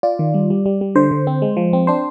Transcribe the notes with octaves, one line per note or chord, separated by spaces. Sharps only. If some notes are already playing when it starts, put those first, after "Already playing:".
F4 D5
D#3
G3
G3
G3
G3
D3 C5
D3
C4
G#3
F3
C4
D4 C5